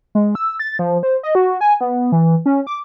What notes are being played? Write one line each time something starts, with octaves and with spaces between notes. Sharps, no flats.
G#3
E6
A6
F3
C5
D#5
F#4
G#5
B3
E3
C#4
D6